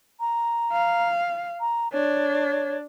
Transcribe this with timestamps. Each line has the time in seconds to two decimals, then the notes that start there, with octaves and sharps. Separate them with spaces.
0.20 A#5
0.72 F5
1.60 A#5
1.93 D4 C#5